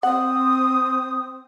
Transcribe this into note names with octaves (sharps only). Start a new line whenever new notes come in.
C4 F#5 D#6